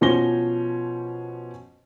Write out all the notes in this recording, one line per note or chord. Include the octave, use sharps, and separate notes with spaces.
B2 F3 C#4 C5 A#6 G7